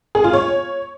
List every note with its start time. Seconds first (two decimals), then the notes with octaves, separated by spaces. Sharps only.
0.15 G#4
0.24 F4
0.33 C#5